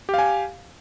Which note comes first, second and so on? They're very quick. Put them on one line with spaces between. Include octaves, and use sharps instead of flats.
G4 F5 G#5